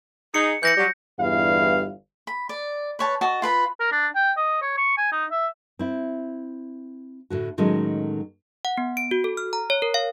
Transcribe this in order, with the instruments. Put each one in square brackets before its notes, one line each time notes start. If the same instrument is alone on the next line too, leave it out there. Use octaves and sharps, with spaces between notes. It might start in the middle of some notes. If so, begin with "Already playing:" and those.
[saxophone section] D#4 G#4 [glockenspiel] C#7
[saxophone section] E3 [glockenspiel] G6 A#6 C#7
[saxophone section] F#3 G3
[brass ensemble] G1 E2 G2 E4 F5
[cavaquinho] B5
D5
B4 C#5 A5
F#4 D#5 A5
F4 B4 B5
[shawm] A#4
D4
G5
D#5
C#5
C#6
G#5
D#4
E5
[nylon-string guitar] C4 E4
A2 D3 F#4
A2 D#3 F#3 G#3 A3 C#4
[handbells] F#5
B3
D7
F#4
A4
F6
A#5
C#5
A#4
F5